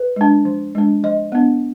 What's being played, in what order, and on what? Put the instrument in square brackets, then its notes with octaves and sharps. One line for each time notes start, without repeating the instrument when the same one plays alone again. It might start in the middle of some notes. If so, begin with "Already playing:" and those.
Already playing: [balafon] B4
G#3 D4
F3
G#3 D4
F3 D#5
B3 D4